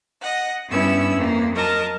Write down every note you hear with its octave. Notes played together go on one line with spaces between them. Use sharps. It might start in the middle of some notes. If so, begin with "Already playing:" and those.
D#5 F#5
G2 B3 C#4 E4 B4 E6
F2 A#3
F#3 A#4 D#5 A5